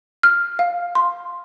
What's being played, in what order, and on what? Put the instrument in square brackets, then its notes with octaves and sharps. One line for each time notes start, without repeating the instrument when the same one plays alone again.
[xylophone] F6
F5
C6